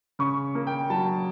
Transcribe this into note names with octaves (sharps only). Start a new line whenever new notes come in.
C#3 C#6
A#3
G5
F#3 A5